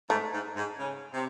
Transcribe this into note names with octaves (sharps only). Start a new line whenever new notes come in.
G#2 A3
G#2
G#2
C#3
C3